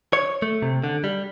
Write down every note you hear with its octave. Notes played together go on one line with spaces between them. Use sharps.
C#5
A3
C3
D3
G3